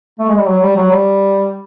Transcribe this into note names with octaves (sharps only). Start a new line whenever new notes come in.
A3
G#3
G3
F#3
G3
F#3
G3